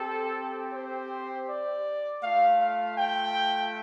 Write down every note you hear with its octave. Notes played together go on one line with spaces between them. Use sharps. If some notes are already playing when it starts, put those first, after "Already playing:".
Already playing: C4 G4 A4
C5
D5
A3 F4 F5
F5
G5